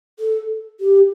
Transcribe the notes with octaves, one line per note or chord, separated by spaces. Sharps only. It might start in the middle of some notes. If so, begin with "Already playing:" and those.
A4
G4